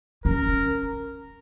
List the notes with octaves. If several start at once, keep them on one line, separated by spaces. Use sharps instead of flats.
C#4 A#4